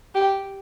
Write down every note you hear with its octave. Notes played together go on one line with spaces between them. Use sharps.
G4